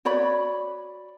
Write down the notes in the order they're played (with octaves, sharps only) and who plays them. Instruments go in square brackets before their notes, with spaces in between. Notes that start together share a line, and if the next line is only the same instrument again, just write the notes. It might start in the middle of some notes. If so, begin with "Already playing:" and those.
[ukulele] F#4 C#5 D5 B5